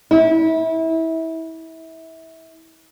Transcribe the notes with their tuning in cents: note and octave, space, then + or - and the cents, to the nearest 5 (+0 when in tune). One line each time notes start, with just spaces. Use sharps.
E4 -25